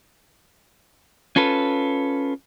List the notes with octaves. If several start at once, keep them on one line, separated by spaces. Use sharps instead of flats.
C#4 F4 A4 B4